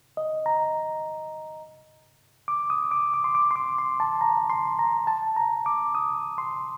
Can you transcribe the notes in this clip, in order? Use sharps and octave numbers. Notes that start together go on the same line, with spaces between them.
D#5
A#5
D6
D#6
D6
D6
C6
D6
C6
D6
C6
A5
A#5
C6
A#5
A5
A#5
D6
D#6
C6